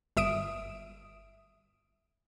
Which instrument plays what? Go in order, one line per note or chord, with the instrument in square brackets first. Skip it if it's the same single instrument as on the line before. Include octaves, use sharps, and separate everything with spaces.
[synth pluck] G1 E5 D#6 D7